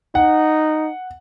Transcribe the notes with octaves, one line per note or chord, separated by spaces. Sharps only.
D#4 F#5